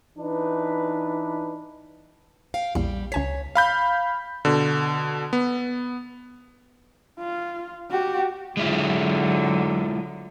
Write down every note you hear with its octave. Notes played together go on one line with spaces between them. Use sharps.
E3 D4 D#4 B4
F5 G5
A#1 E2 G3
C#2 C#5 G#5 B6
F5 B5 G6
B2 D3
B3
F4
F#4 G4
D3 F#3 G#3 E4 F4